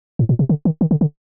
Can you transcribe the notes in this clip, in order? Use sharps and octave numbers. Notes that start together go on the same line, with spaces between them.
A2
A#2
C3
D3
D#3
D#3
D3
D3